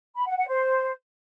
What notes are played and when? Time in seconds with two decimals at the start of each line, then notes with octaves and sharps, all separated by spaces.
0.16 B5
0.26 F#5
0.37 F#5
0.47 C5